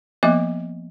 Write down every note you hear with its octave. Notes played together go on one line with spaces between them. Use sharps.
F3 A#3 B3 D#5 E5 D6